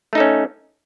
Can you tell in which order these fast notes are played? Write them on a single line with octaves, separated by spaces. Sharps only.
A3 D#4 A4 C#4